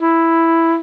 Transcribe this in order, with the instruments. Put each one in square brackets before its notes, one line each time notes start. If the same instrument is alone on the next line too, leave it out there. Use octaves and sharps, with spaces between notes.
[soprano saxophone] E4